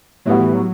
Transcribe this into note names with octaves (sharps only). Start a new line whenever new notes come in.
A2 F#3 G3 B3 F#4
E3
F#3